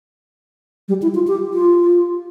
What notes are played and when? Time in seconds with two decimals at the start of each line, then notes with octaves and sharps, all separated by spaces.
0.88 G3
1.02 E4
1.15 F4
1.28 G4
1.54 F4